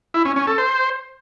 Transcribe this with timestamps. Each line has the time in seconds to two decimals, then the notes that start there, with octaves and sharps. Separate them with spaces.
0.14 E4
0.25 C#4
0.36 C#4
0.47 A4
0.58 C5